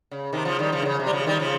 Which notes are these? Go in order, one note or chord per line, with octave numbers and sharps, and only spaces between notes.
C#3
C3 D#3
C#3 F3
D#3 G3
C#3 F3
D#3
C#3
C3
G3
C#3 F3
D#3 G3
C#3 F3